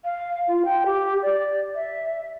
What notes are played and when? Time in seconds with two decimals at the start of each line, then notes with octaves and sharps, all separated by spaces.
0.04 F5
0.48 F4
0.65 G5
0.86 G4
1.22 D5
1.75 E5